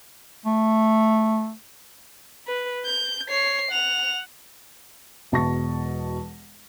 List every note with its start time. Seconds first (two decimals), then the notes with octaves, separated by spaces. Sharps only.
0.46 A3
2.47 B4
2.85 G6
3.29 C#5 C7
3.71 F#5 F7
5.32 E1 B2 A5 C#6 A#6